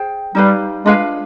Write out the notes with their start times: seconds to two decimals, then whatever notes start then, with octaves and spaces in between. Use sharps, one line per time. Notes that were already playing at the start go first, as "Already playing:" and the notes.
Already playing: G#4 C5 G5
0.35 G3 D#4 G4 B4 F5
0.85 G#3 D4 F4 B4 F5